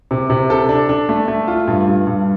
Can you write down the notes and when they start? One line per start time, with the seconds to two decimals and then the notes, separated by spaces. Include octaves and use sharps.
0.11 C3
0.30 C3
0.50 A4
0.69 D4
0.89 D4
1.09 A3
1.28 A3
1.48 F4
1.67 G2
1.88 G2
2.07 G2